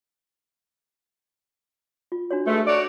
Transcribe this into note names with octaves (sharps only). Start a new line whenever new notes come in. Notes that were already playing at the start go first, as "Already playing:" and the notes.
F4
D4 F#4 C#5
G#3 A3 B4
F#4 C#5 D5